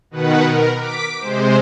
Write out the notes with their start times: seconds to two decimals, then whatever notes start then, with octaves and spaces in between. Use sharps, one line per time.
0.11 B2 D#3 B4 F#5
0.42 A#4
0.79 D6 B6 D7
1.20 C3 G#3 C5